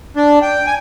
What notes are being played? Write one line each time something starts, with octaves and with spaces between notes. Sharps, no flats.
D4
G5
G#5